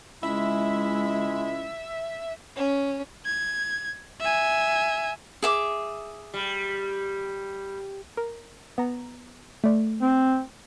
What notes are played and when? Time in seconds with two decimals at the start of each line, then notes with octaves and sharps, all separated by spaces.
0.23 C#2 G#3 E4 E5
2.55 C#4
3.26 G#6
4.21 E5 G#5
5.43 G#4 E5 D6
6.34 G3
8.17 A#4
8.78 B3 A#5
9.64 A3 D5
10.02 C4